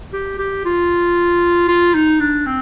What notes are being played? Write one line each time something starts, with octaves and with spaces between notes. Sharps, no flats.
G4
G4
F4
F4
D#4
D4
C4